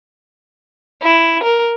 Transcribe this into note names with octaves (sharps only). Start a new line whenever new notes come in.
E4
A#4